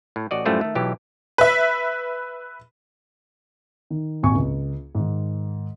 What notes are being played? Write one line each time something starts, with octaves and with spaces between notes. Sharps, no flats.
A2
A1 F#4 D5 D#5
F#2 A2 G3 A3 F4 C5
D#3 A3
B1 B2 E3 G4
B4 E5
D#3
D#1 G#1 G#5 C#6
C#2
G#2 D#3